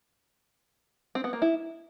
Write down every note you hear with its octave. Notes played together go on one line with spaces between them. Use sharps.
C4
B3
A#3
E4